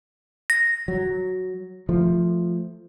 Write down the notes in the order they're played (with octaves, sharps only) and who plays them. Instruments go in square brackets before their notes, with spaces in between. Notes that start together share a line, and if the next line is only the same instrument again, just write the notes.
[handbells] A#6
[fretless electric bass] F#3
F3 A3